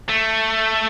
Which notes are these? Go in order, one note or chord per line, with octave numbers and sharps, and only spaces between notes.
A3